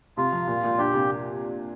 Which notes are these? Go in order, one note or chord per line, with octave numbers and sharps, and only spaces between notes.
C3 F4
F3
A#2
A#2
D4 G4
C3